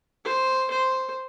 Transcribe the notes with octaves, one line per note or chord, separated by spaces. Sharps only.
C5
C5